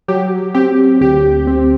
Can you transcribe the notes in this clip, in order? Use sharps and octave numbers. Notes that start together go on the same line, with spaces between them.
F#3 G4
C4 G4
D2 G4
C4